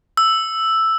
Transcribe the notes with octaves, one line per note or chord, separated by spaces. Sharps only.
E6